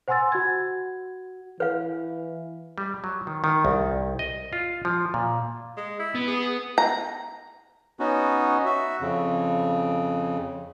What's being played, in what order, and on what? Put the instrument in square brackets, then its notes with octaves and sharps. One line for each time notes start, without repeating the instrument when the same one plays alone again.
[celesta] C5 F#5 G#5 C6 E6 A6
F#4 F#5 G#6
[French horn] E3 [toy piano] B4 F5
[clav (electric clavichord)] G3
F#3
D#3
D#3
C2
D#5
F4
F3
A#2
[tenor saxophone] G#3
E4
[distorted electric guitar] B3
[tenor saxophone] G#4
[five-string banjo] A#5
[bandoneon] B3 C#4 D#4 F#4
F#4 E5
F2 C#3